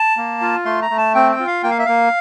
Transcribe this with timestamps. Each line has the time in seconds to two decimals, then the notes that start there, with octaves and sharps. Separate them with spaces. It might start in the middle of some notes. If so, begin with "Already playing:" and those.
Already playing: A5
0.17 A#3
0.42 F4
0.65 A3 C6
0.82 A#5
0.90 A3
0.98 A5
1.15 C4 G5
1.32 G5
1.40 F4
1.47 F5
1.63 A#3 G5
1.70 F5
1.79 E5
1.86 A#3 F5